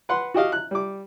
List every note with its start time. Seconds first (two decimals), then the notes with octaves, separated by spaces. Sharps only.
0.09 B4 F#5 C6
0.34 F#4 G4 D#5 F5
0.52 F#6
0.71 G3 D6